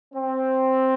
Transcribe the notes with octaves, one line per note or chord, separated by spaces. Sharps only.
C4